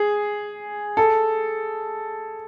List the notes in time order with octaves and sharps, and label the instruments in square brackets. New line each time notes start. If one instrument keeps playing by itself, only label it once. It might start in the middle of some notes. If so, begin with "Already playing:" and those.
Already playing: [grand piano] G#4
A4